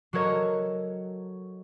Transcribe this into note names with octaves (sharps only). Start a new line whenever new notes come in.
F#3 F#4 A4 A#4 C#5 D#5